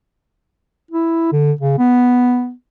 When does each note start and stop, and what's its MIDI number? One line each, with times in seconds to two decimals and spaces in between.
0.91 1.31 64
1.32 1.52 50
1.61 1.75 49
1.79 2.52 59